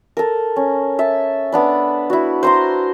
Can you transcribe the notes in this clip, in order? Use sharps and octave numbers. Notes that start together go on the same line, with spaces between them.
A4 A#4
C#4
E5 A5
B3 D4 B5
E4 F#4
C5 A#5 C6